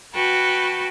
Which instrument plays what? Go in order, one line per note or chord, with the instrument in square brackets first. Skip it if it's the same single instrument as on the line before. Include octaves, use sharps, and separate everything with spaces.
[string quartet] F#4 B4 G5 A5